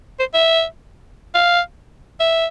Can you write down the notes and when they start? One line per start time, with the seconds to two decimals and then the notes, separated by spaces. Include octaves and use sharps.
0.20 C5
0.34 E5
1.35 F5
2.20 E5